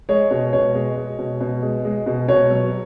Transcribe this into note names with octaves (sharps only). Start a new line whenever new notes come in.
G#3 C#5
B2
B2 C#5
G#3
G#3
B2
B2
G#3
G#3
B2
B2 C#5
F#3